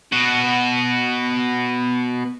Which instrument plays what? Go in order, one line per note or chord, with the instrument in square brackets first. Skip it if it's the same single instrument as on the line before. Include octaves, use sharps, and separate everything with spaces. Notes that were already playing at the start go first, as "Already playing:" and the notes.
[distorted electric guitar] B2 F#4